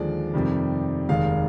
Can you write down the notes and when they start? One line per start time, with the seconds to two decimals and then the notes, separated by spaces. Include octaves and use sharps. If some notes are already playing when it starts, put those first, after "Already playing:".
Already playing: D#2 D3 F3 G#3 D5
0.34 F2 C3 D#3 G3
1.09 F1 D#2 D#3 G#3 F5